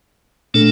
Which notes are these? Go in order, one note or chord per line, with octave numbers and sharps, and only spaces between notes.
A#2 A3 D4 A4